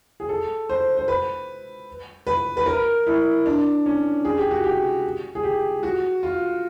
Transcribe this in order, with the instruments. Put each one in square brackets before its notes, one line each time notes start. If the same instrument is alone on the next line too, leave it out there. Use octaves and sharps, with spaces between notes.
[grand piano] G#4
A4
C5
C5
B4
B4
B4
A#4
E4
D4
C#4
G#4
G4
F#4
G4
G#4
G4
F#4
F4